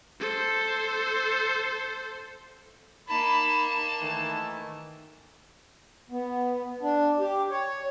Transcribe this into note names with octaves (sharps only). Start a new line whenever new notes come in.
A4 C5
A#3 D#4 A5 B5
D#3 E3 A3
B3
D4
G4
C#5